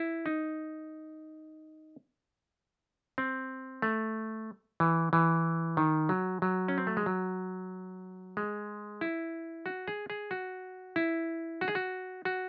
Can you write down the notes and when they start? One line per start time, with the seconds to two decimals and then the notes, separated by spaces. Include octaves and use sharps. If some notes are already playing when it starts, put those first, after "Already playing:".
Already playing: E4
0.26 D#4
3.18 C4
3.82 A3
4.80 E3
5.13 E3
5.77 D#3
6.09 F#3
6.42 F#3
6.68 C#4
6.78 C4
6.87 A3
6.97 G#3
7.06 F#3
8.37 G#3
9.01 E4
9.66 F#4
9.88 G#4
10.10 G#4
10.31 F#4
10.96 E4
11.61 F#4
11.68 G#4
11.75 F#4
12.25 F#4